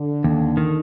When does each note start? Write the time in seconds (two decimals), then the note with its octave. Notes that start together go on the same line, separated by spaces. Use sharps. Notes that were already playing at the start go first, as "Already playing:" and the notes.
Already playing: D3
0.24 D#2
0.57 D#3